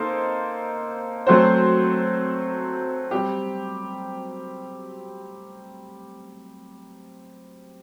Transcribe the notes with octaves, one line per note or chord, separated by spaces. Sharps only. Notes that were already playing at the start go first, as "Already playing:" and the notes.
Already playing: A#3 D#4 A4 C5 D#5
F#3 A3 C4 F#4 C5
G3 C4 G4